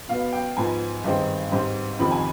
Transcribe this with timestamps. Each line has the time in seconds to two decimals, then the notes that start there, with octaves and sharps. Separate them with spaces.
0.09 B2 B3 F5
0.33 G5
0.57 G#2 F3 B3 G#5
1.04 G2 D#3 G#3 C4
1.52 G#2 G3 C4
1.99 F2 C3 D#3 B5
2.11 G#5